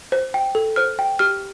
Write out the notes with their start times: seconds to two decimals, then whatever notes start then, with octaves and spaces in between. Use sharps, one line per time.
0.12 C5
0.34 G5
0.55 A4
0.76 C5 F6
0.99 G5
1.19 G4 F6